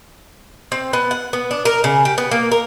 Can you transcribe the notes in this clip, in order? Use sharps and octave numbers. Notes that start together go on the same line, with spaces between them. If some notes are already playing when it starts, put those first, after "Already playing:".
C4
B3
F#5
B3
D4
A#4
C#3
G4
B3
A#3
A#4